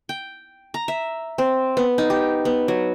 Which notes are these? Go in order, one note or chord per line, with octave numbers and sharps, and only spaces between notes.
G5
A#5
E5
C4
B3
D#4
G4
B3
F#3